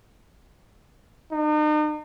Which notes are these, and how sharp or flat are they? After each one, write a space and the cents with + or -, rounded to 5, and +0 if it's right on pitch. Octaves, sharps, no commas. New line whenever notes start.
D#4 -40